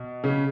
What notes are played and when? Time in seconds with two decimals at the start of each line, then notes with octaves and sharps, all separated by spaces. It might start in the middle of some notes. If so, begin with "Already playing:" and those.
Already playing: B2
0.24 C#3 C#4